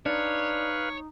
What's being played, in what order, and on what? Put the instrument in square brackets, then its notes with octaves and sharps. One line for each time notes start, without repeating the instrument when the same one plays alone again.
[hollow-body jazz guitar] D4 [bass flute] D#4 [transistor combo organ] B4 F5 [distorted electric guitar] C#5